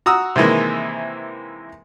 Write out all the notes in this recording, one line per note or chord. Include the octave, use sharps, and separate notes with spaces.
F#4 A#5 D#6 E6
C3 D#3 E3 G#3 A#3